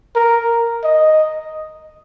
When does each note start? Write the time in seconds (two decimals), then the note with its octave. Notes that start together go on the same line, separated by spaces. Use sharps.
0.15 A#4
0.84 D#5